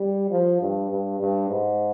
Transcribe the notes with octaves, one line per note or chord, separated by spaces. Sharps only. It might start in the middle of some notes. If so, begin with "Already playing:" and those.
Already playing: G3
F3
G2
G2
G2
G#2